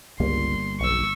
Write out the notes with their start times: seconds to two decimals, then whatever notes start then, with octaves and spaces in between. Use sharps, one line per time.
0.20 G1 C#2 G3 A#3 C6
0.80 B1 C#6 E6